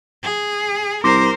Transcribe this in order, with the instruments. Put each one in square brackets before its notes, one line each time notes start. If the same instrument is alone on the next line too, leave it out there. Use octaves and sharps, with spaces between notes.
[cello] G#4
[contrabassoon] C2 [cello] A#4 C5 [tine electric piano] C6 D6 A#6